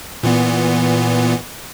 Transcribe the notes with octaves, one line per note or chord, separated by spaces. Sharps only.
A#2 E3 B3